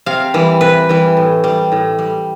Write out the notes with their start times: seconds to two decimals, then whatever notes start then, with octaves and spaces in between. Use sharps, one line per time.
0.06 C3 F5
0.34 E3 G3
0.61 C3 B4
0.89 E3 G3
1.17 A2
1.44 G3
1.72 A2
1.99 G3